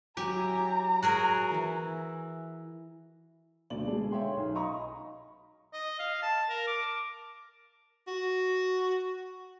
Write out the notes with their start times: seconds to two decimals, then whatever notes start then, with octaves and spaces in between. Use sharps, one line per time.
0.17 F#3 E4 G4 G#5 A#5
1.02 F#4 G#4 A#4
1.51 E3 E4
3.70 D2 B2 D3 D5 F#7
3.86 G#3 B3 D4 G#4 A4
4.12 C#5 E5 F5 G5 C6
4.37 B1
4.55 D#5 F5 A#5 B5 C#6 D#6
5.73 D#5
5.99 F5
6.23 A5
6.50 A#4
6.67 D6
8.07 F#4